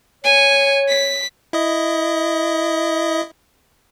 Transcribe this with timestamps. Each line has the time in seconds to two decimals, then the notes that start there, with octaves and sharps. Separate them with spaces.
0.24 C#5 G#5 C#7
0.89 B6
1.53 E4 D#5